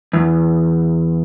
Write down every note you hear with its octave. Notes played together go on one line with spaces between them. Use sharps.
E2